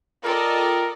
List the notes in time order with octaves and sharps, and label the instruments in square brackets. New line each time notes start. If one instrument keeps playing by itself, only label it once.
[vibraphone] F4 G5 [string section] A4 D5 D#5 [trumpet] A#4